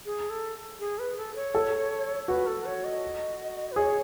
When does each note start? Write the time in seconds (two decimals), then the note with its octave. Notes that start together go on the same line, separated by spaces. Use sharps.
0.05 G#4
0.30 A4
0.80 G#4
0.99 B4
1.17 A4
1.36 C#5
1.55 A4
2.28 F#4 B4
2.47 A4
2.65 C#5
2.85 D#5
3.72 B4
3.76 G#4 C#5